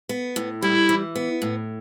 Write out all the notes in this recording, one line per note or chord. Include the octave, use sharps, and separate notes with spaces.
B3
A2
G3 E4
E3
B3
A2